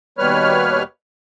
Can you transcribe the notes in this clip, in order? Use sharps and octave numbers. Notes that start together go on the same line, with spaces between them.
D#2 B2 G3 B4 C#5 F6